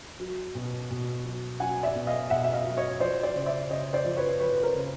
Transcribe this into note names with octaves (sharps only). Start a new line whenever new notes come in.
F#3
B2
B2
F#3
F#3 F#5 G#5
D5 E5
B2
D#5 F5
B2 E5 F#5
E5
D#5 F5
F#3
C#5 D#5
F3 C5 D5
C5 D5
C#3
D5 E5
C#3 C#5 D#5
C5 D5
F3
B4 C#5
F3 B4 C#5
B4
A#4 C5
C#3